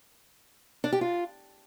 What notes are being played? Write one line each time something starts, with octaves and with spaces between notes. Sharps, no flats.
D4
G4
F4